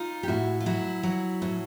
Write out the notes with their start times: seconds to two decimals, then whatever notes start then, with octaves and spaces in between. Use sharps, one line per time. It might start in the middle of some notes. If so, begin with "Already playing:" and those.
Already playing: D#4 F4
0.23 G4
0.28 A2 E4 F#4
0.61 F4
0.66 F#3 E4 F#4
1.03 F#3
1.42 A2